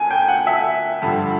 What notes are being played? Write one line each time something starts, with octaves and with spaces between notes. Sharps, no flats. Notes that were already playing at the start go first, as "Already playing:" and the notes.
Already playing: D2 G#5
G5
F#5
E5
G2 D3 F3